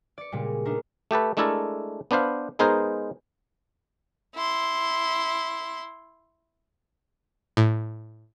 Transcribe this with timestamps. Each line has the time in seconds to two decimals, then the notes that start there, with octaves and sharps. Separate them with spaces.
0.18 D5 C#7
0.32 A#2 C#3 G3 G#3
0.65 A3 D4 D#4 A#4
1.11 A3 G4 A4 B4
1.37 G#3 A3 D4 E4 A4 A#4
2.11 B3 D4 B4 C5 F5
2.59 G#3 B3 D#4 G#4 A#4 C5
4.35 E4 C6
7.57 A2